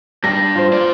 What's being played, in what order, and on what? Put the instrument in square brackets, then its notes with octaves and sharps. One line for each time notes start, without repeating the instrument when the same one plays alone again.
[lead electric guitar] G3 D4 [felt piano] A#6
[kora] F4 C5
[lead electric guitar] A#3 D5